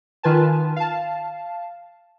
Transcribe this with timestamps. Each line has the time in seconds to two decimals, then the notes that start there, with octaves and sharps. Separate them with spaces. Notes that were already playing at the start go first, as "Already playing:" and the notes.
0.23 D#3 F4 B4 G#5 A5
0.76 F5 A5